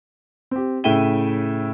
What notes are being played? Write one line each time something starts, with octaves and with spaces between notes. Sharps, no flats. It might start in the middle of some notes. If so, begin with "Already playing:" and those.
C4 G4
A2 C#3 E5 G5 D#7 G7